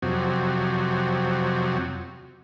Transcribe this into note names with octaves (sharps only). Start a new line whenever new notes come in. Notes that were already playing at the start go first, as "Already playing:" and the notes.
F2 C3 F#3